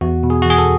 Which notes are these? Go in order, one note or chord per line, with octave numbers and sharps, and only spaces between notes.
E2 F#4
B2
G#4
E2 F#4
G#4
A4